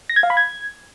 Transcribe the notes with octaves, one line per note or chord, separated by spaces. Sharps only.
A#6
G#6
F5
B5
G#6